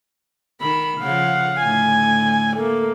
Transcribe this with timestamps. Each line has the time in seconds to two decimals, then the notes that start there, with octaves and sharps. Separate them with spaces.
0.61 D#3 B5
1.01 C#3 F3 F5 F#5
1.61 A2 D3 G#5
2.56 A3 A#3